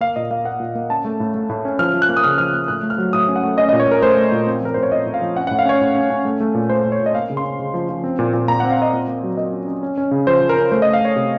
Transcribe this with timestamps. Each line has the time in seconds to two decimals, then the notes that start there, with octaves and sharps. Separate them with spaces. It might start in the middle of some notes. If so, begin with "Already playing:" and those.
0.01 A#3 F5
0.16 A#2 D#5
0.31 A#3 F5
0.45 A#3 F#5
0.60 A#2
0.75 A#3
0.90 C#4 A5
1.05 A3
1.20 A2
1.34 A3
1.49 A2
1.65 C#4
1.79 F3 F6
1.94 F3
2.02 F#6
2.09 A#3
2.17 D#6
2.24 C#3 F6
2.38 F3 F6
2.53 A#3 F#6
2.68 A2 F#6
2.83 A3
2.90 F6
2.98 F#3
3.13 A2 D#6
3.28 C#4
3.36 F#5
3.43 A3
3.57 C#4 D#5
3.69 D#5
3.73 A#2
3.80 C#5
3.88 A#2 A#4
4.02 A3 C5
4.17 A3
4.32 A#2
4.47 C4
4.61 F3 A#4
4.74 A2 C5
4.83 C#5
4.92 A2 D#5
5.06 A2
5.14 F5
5.21 F3
5.36 C#4 F#5
5.47 F#5
5.51 A2
5.59 F5
5.65 C#4 C#5
5.81 A2
5.95 C#4
6.10 C#4
6.25 A3
6.40 A3
6.55 A#2
6.70 A3 C5
6.85 A#2
6.92 C#5
7.00 A#2
7.06 D#5
7.15 A#3 F5
7.30 C#3
7.37 C6
7.44 C#4
7.59 C#3
7.74 F3
7.89 F3
8.04 C4
8.19 A#2
8.33 A#2
8.48 A#2 A#5
8.60 F#5
8.63 C4
8.71 F5
8.78 C4 D#5
8.93 A#2
9.08 A#3
9.23 F#3
9.37 A#3 D#5
9.53 C#4
9.68 C#4
9.83 C#4
9.98 C#4
10.11 C#3
10.27 F3 C5
10.41 F3
10.49 A#4
10.57 C#4
10.71 A3 C5
10.82 D#5
10.87 A3
10.93 F5
11.01 A3 C#5
11.16 C3